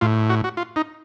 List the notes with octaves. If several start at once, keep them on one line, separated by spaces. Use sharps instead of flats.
A2 F4
F#4
F#4
F4
D#4